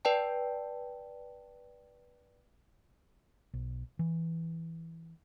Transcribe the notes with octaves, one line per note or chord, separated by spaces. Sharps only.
B4 D5 G5 A5
B1
E3